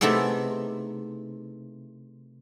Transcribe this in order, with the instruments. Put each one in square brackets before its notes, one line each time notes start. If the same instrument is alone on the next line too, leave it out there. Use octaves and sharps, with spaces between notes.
[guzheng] C3 A3 B3 D#4 E4 G#4